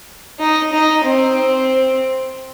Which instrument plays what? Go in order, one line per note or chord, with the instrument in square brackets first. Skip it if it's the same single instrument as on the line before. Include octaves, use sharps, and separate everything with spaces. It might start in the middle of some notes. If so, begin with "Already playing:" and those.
[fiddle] D#4
D#4
C4